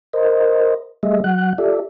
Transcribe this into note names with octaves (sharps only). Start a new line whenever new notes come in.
A#4 C5 D#5
G3 A3 G#4 D#5 E5
F#3 F#5 F#6
F4 G4 A4 D5 E5